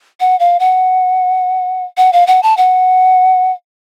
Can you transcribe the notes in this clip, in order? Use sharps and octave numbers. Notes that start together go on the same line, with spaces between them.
F#5
F5
F#5
F#5
F5
F#5
A5
F#5